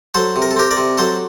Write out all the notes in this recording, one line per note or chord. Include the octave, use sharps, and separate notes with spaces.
F#3 A4 C5
C3
A#4
A4
C4 G4 A#4
A#4 D5
C3
F#3 A4 C5